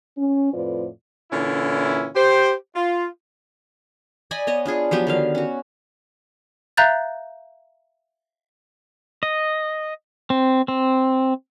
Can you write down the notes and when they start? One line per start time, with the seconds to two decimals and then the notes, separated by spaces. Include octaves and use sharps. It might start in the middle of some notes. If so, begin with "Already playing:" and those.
0.18 C#4
0.53 F2 A2 F4 B4 C5 D5
1.32 A#2 D3 E3 C#4 E4
2.15 G4 C5
2.76 F4
4.31 D5 D#5 G#5 B5
4.47 B3 C#5 D#5
4.66 D4 F4 G#4 C#6
4.91 F3 F#3 B3 G4
5.07 D3 D#3 F5
5.35 C#4 F#4
6.77 E5 F5 A#5 F#6 G6 A6
9.23 D#5
10.30 C4
10.68 C4